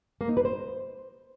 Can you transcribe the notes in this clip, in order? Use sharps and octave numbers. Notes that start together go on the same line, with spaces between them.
A#3
D#4
B4
C5